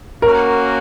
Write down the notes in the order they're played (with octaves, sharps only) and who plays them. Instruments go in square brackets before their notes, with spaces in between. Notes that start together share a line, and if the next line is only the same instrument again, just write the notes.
[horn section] A#3 C#4 F#4 [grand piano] A#4